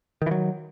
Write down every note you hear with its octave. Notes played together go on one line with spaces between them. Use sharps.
D#3 E3 F#3